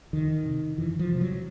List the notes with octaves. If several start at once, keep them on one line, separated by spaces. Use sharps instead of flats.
F2 D#3
C3
F2 E3
F3
C3
F#3